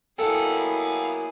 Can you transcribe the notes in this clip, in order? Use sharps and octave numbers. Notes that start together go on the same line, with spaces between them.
F#3 A#3 B3 E4 G#4 A4 F5 G5